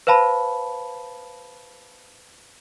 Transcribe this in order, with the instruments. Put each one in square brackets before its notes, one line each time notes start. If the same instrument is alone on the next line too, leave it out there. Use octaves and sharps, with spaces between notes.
[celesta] B4 C5 F5 A5 B5